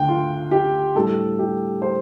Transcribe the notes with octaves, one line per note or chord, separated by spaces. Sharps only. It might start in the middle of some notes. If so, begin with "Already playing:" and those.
Already playing: D2 A3 D4 G5
F4
G4
A2 G3 D4 A4
G4
C5